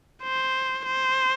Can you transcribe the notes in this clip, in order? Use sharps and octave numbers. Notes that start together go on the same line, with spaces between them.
C5
C5